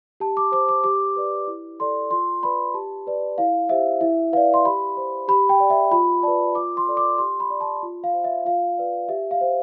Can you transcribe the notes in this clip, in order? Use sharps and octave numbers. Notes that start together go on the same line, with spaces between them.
G4 A5
D6
C5 D6
D6
G4 D6
B4 D5
E4
A4 D5 C6
F4 C6
B4 D5 B5
G4 A5
B4 D5
E4 F5
G4 C5 E5
E4 E5
B4 D5 F5
C6
G4 B5
C5
G4 B5
G5
D5
E5
F4 B5
B4 D5 A5
F4 D6
C6
A4 D5
D6
G4 C6
B5
D5
A5
F4
F5
C5
E5
F4 F5
B4 D5
G4 E5
F5
C5